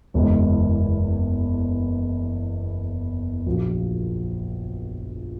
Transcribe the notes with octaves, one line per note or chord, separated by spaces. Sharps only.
F#1 E2 C#3 E3 G#3
A#1 A#2 F#3